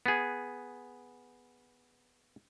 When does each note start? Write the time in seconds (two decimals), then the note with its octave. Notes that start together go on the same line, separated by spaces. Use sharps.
0.06 B3 G#4